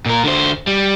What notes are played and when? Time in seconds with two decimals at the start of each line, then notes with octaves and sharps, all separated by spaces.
0.06 A#2 A#4
0.24 D3 C5
0.67 G3